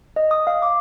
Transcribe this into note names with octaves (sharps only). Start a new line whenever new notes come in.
D#5
D#6
F5
D6